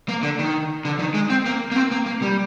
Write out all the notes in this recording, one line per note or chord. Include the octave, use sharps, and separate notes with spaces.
A#3
D3
D#3
D3
D#3
G#3
C4
A#3
A#3
C4
A#3
A#3
G3